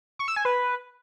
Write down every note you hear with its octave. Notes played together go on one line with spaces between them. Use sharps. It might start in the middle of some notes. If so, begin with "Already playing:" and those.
C#6
E6
G#5
B4